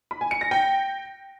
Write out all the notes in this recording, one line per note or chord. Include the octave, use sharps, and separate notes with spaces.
B5
G#5
C#7
A#6
G5